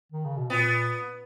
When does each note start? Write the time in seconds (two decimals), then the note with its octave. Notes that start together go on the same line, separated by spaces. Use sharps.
0.12 D#3
0.25 C#3
0.37 B2
0.50 A#2 B3